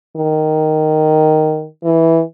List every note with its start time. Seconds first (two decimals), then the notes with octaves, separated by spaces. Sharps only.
0.16 D#3
1.84 E3